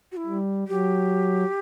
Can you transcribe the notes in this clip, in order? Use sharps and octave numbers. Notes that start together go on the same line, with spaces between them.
F#4
E4
G3
F#3 G4